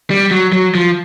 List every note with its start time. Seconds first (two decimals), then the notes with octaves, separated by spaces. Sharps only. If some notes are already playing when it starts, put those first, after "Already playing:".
0.10 G3
0.31 F#3
0.52 F#3
0.75 F3